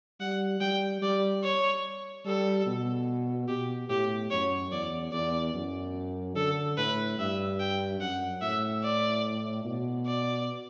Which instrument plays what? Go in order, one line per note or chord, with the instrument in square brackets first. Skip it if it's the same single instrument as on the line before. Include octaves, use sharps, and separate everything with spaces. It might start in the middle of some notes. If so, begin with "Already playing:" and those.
[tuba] G3 [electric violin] F#5
[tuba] G3 [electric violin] G5
[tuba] G3 [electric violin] D5
[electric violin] C#5
[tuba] G3 [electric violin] A4
[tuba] B2
[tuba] B2 [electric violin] G4
[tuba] A2 [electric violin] G4
[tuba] F#2 [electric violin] C#5
[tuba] E2 [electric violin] D5
[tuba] E2 [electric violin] D5
[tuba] F#2
[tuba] D3 [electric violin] A4
[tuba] A2 [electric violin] B4
[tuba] G2 [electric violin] E5
[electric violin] G5
[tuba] F#2 [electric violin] F#5
[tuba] A2 [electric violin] E5
[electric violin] D5
[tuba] B2
[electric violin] D5